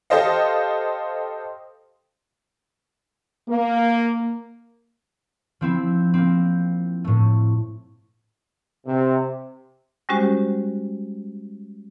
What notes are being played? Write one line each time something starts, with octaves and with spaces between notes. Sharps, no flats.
G4 A4 C5 D#5 F5
A#3
F3 C4 E4
A#3 C4
A2 A3
C3
G3 G#3 C#4 F#4 G4 C5